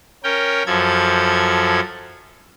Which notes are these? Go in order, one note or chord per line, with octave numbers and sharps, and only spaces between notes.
C#4 A#4 G5
F#2 F3 A4 G#6